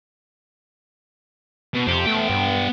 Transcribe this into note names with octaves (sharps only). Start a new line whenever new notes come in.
B2
F2 G4 C5
A3 B3 G5
G2